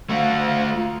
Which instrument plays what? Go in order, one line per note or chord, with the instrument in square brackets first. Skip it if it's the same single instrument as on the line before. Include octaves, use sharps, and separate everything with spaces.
[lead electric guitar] A3 F#4 [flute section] F5
[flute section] F4 A#5